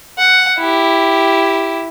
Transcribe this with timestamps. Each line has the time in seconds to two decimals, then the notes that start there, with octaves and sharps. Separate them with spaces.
0.18 F#5
0.59 E4 G4